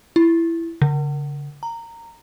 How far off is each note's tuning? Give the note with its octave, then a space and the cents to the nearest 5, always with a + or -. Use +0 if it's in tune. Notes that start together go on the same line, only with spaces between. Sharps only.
E4 +15
D3 -45
A#5 -15